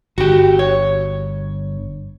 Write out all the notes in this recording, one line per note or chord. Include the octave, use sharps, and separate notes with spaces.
G1 F#4 G4
C#5